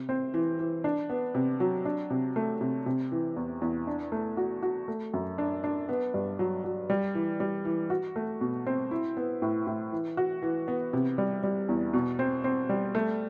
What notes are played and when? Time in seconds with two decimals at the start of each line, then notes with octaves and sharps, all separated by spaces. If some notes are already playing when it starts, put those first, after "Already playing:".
Already playing: C3
0.09 C4
0.34 E3
0.59 E3
0.84 D4
1.10 B3
1.35 C3
1.60 F#3
1.85 D4
2.10 C3
2.36 A3
2.61 C3
2.86 C3
3.12 E3
3.36 E2
3.62 E2
3.87 D4
4.12 A3
4.37 F#4
4.63 F#4
4.88 A3
5.14 F#2
5.38 D4
5.64 D4
5.89 B3
6.14 G2
6.39 F#3
6.64 F#3
6.90 G3
7.15 E3
7.40 G3
7.65 E3
7.90 F#4
8.16 A3
8.41 B2
8.67 C4
8.91 E4
9.17 B3
9.42 A2
9.67 A2
9.92 E3
10.17 F#4
10.42 E3
10.68 B3
10.93 C3
11.18 G3
11.43 G3
11.69 E2
11.94 B2
12.19 C4
12.44 C4
12.69 G3
12.95 A3